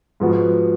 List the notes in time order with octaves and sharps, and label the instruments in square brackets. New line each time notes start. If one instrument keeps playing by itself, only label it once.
[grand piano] G#2 F3 B3 F#4